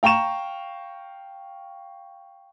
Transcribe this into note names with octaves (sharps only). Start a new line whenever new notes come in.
F5 G5 A#5 C#6 E7